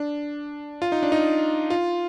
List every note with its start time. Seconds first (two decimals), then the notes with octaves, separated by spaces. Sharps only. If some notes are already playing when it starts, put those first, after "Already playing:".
Already playing: D4
0.82 F4
0.92 D#4
1.03 D4
1.12 D#4
1.70 F4